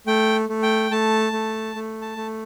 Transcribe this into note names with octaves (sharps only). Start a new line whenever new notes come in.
A3 G5
A3
G5
A3 A5
A3
A3
A5
A3